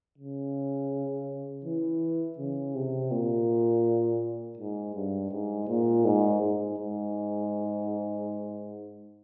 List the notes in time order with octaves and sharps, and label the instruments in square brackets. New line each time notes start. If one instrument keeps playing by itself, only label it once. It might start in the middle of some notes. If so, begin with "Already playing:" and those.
[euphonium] C#3
E3
C#3
C3
A#2
G#2
G2
G#2
A#2
G#2
G#2
G#2